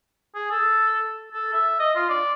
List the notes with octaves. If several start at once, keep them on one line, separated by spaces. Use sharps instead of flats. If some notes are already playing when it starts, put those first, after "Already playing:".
G#4
A4
A4
E5
D#5
F4
D5